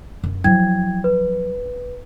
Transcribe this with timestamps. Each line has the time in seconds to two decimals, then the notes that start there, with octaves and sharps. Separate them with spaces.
0.23 F#2
0.44 F3 F#3 E4 G5 G#6
1.04 B4